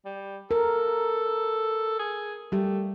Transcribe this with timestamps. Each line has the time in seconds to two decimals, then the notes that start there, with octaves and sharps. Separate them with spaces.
0.05 G3
0.51 A4 A#4
1.99 G#4
2.52 G3 A3 G4